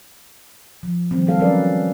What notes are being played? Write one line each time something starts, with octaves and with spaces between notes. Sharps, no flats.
F3
D#3 F3 G3 C4
F#3 G3 A#3 A4 F5
F#3 C#4 A#4 B4 D5